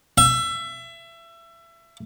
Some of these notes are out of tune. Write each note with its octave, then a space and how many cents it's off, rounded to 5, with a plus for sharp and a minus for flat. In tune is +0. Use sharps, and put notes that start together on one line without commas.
E5 +25